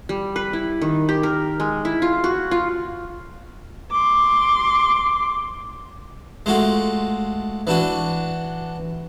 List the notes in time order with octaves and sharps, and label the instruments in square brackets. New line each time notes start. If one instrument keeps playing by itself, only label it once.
[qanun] G3
B4
E4
D#3
G4
A#4
G#3
E4
F4
F#4
F4
[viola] C6 D6
[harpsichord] G#3 A3 F4 F#4
E3 D4 F#4